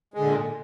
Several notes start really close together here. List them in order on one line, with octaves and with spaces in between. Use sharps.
G#3 D3 A#2